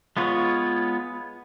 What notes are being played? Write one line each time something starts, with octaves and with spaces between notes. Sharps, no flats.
G#3 B3 F4 C#5